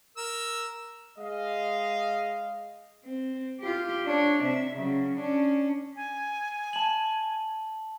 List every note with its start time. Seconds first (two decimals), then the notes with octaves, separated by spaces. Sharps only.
0.17 A#4 E6
1.19 G#3 D#5 F5
3.05 C4
3.61 F4 G4
4.07 D4 C#5
4.44 C3 E5
4.76 C#3 F#3
5.15 C#4 D4
5.96 G#5
6.73 A5 F#7